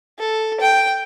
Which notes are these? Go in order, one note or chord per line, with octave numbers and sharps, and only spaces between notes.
A4
G5